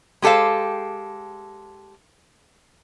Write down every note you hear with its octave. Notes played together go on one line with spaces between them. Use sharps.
G#3 G4 A4 C5 F5